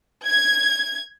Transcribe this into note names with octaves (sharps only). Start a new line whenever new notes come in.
G#6